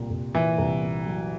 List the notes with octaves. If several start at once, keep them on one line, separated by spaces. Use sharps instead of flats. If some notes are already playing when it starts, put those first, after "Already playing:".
Already playing: C2 A#2
C2
A#2 E3
C2
A#2
F#3